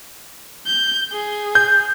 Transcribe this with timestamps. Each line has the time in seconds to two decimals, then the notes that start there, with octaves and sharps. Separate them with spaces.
0.66 G6
1.12 G#4
1.55 G6